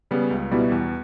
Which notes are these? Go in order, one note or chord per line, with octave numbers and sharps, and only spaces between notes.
C#3 G3 B3
C#2
B2 G3 B3 E4
E2